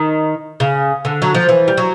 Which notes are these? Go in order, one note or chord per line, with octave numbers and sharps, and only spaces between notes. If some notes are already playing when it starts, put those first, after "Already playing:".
Already playing: D#3
C#3
D3
F#3
F3
E3
G3
F#3